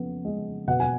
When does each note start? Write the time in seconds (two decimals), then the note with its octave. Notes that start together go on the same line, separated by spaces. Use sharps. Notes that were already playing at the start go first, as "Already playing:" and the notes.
Already playing: F2 C#3 B3
0.25 G#3
0.68 B2 F#5
0.80 G#5